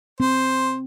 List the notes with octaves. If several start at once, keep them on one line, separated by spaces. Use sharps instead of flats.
C4 C5